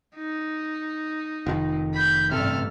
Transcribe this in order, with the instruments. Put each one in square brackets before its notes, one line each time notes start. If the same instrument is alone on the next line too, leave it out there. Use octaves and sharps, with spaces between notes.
[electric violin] D#4
[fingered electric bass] F1 D#3
[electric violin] B5 G6
[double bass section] A1 G2 [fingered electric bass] C3 [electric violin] A4 F6